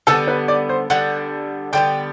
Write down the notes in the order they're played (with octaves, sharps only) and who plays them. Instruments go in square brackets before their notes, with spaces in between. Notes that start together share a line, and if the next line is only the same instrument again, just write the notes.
[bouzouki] D3 G3 B3 [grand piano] A4
[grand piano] B4
D5
C5
[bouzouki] D3 G3 B3 [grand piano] F#5
[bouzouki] D3 G3 B3 [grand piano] G5